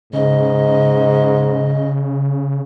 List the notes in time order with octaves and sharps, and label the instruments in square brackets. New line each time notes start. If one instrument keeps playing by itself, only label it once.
[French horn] G#2 [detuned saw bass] C#3 [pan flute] D#5